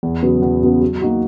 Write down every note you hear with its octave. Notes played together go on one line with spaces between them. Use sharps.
E2
C#3 F#3 B3
E2
C#3 F#3 B3
F#3
A#3 D#4 F#4